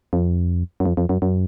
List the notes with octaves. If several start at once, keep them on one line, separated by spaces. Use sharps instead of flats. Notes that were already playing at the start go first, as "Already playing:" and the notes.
F2
F#2
F2
F2
F#2
F#2